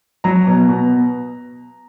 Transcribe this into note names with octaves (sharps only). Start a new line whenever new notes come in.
F#3 A#5
B2
B2